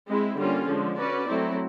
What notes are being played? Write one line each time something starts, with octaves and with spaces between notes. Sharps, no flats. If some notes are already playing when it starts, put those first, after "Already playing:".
G#3 C4 E4
D3 G3 A#3 C#4 F4
D3 F3 G#3
C#4 F#4 B4 D5
F#3 A3 C4 E4